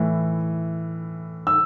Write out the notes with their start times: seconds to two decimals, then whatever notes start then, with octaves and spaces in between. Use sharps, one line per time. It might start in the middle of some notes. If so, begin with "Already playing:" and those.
Already playing: A2 E3
1.47 E6